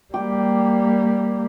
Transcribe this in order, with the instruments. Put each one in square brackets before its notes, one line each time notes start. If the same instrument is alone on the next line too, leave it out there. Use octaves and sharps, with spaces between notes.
[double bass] G3 A#3 [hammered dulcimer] G4